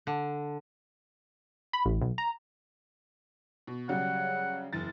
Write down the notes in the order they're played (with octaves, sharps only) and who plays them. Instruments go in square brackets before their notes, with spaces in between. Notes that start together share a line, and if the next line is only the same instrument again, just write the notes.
[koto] D3
[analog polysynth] B5
A1
B1
A#5
[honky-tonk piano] B2
[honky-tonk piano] C#3 F#3 G3 [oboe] F#5
[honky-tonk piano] F#1 E2 A6